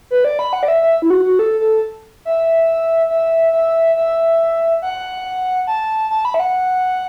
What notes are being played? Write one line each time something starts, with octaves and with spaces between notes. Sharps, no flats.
B4
D5
B5
F#5
D5
E5
E5
E4
F#4
F#4
A4
A4
E5
E5
E5
E5
F#5
A5
A5
B5
E5
F#5